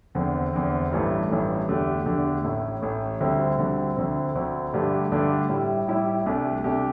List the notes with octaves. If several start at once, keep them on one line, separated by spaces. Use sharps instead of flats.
E2 D3 C4
E2 D3 C4
A1 G2 E3 A3
A1 G2 E3 A3
E2 D3 A3 D4 G4
E2 D3 A3 D4 G4
A1 A2 A3
A1 A2 A3
D2 D3 G3 C4
D2 D3 G3 C4
D2 D3 C4
D2 D3 C4
G2 D3 A3 D4 G4
G2 D3 A3 D4 G4
A2 G3 E4 G4
A2 G3 E4 G4
C2 C3 A3 D4 G4
C2 C3 A3 D4 G4